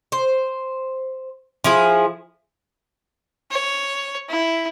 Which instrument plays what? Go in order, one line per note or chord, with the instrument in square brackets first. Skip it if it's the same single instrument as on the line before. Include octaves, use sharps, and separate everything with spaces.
[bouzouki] C5
F3 E4 G#4
[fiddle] C#5
E4